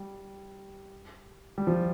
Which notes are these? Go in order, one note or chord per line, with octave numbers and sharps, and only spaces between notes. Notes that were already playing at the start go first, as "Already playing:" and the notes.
Already playing: G3
G3
F3